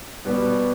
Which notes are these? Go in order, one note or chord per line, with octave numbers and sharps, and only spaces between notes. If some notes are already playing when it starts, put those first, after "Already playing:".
B2 G3 B3